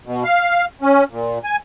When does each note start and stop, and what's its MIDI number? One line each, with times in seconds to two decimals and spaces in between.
0.06 0.24 47
0.24 0.65 77
0.81 1.04 61
1.11 1.39 46
1.44 1.56 80